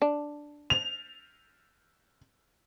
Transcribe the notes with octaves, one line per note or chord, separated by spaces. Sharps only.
D4
F7